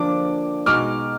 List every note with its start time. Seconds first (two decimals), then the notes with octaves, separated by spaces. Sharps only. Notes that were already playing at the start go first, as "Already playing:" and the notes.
Already playing: D3 F3 A#3 D4 D6
0.66 B2 G#3 D#4 F#4 D6 F6